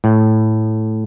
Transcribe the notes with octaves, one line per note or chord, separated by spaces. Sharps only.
A2